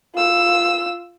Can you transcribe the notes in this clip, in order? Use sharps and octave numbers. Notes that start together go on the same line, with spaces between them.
F4 E6